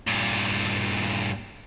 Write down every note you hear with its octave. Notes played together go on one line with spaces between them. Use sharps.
G2 A#2